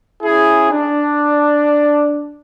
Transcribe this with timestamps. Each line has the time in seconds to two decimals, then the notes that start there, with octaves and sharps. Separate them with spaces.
0.23 C#4 E4 G#4
0.71 D4